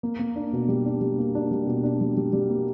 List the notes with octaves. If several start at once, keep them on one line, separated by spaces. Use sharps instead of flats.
A#3
A#3
D4
B2
G3
D4
G3
A#3
D4
G3
B2
D4
G3
G3
G3
A#3